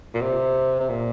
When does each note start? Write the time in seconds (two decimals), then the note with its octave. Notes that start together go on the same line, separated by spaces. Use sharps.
0.14 A#2
0.22 C3
0.81 C3
0.90 A#2